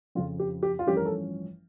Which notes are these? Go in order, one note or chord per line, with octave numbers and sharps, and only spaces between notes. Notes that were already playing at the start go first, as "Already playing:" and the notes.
F2 C#3 F3 F4
G4
G4
F4
A1 G2 F3 C#4 G4
A#4
A4